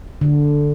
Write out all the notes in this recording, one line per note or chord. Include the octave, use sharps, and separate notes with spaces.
D3